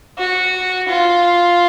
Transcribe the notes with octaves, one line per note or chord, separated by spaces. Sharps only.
F#4
F4